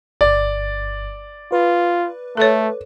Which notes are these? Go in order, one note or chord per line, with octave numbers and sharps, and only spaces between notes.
G1 D5
F4 B4
A3 A4 C#5